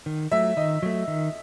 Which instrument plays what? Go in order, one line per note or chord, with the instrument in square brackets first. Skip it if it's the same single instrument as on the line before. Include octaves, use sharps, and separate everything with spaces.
[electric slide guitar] D#3
[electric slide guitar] F#3 A3 [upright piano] E5
[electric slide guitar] D#3 [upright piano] D#5
[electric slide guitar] F#3 A3
D#3